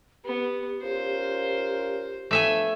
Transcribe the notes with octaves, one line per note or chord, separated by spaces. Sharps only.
B3 G4
C#4 F4 A#4 C5
F3 A3 B3 D4 E5 G#5